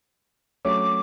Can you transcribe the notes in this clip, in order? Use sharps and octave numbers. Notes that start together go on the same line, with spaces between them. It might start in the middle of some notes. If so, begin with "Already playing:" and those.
F#3 A3 C#4 D6